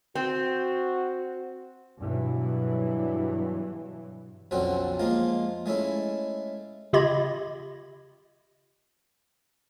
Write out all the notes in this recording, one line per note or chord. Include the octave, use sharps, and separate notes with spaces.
C4 F#4
G2 B2 E3 F#3
B1 F2 D3 C4 C#4 F#4
F3 G#3 A#3 F4
G#3 A3 C#4 E4
C#3 F4 G4 D#5 B5 G#6